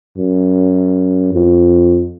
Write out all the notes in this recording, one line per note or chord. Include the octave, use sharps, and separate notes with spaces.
F#2
F2